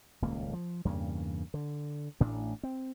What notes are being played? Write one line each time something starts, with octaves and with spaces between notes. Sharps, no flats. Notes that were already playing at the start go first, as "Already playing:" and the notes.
D#1 C#2 A#3
F3
E2 G2 C#3 A#3
D3
A1 A2 D4
C4